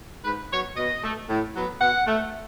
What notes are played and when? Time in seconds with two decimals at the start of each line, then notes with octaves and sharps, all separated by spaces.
0.24 G#2 B4
0.51 F#3 B3 C#5
0.76 B2 D#5
1.03 A3
1.29 A2
1.54 F#3 B3
1.80 B2 F#5
2.06 A3